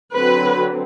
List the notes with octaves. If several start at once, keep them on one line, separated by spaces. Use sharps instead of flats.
D3 F#3 C4 B4